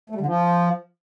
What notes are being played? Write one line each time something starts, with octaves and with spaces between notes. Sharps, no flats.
A3
G3
D3
F3